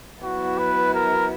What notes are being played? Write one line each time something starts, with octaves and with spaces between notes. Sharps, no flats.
F#3 B3 E4 F#4
B4
A#4